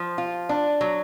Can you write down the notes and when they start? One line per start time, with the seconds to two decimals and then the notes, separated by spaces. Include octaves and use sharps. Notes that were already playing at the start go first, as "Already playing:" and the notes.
Already playing: F3
0.18 F4
0.49 D4
0.81 F#3